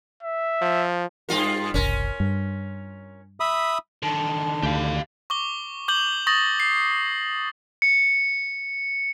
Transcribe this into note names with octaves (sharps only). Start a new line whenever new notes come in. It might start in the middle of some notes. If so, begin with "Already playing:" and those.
E5
F3
G2 F4 A#4
F#1 C2 C#4 A#4
G2
E5 B5 D#6
D3 D#3 A5
D2 G4 F5
C#6 D6 G7
D6 G6 F#7 G7
C#6 D#6 A6 A#6 F#7
C7
C#7